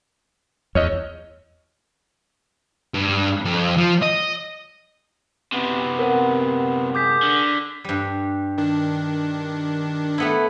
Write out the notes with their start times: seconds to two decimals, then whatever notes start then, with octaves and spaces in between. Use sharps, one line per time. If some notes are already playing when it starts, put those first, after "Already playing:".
0.75 E2 C#5 D#5
2.94 G2
3.45 F2
3.78 F3
4.03 D#5
5.53 F#2 C3 B3
5.99 A#4 C5 F#5
6.95 G#4 D6 G6 B6
7.23 D3
7.84 G2 G3
8.58 D#3 D4
10.18 A3 B3 E4